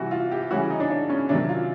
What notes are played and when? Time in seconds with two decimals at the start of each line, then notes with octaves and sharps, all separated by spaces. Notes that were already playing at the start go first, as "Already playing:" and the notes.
Already playing: C3 E3 G3 F#4
0.11 F4
0.31 G4
0.51 C#3 E3 G3 F#4
0.70 D#4
0.80 D4
0.90 D4
1.10 C#4
1.29 C3 D#3 F#3 D4
1.49 F4